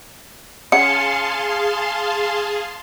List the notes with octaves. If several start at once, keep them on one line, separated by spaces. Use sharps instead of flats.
C#4 G#4 F5 F#5 A5 C6 C#7